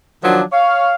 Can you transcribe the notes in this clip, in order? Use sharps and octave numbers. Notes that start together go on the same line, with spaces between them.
D#3 F3 F#3 D4
C#5 F5